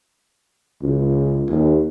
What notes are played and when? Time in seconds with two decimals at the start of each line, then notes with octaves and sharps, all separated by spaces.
0.82 C#2
1.50 D#2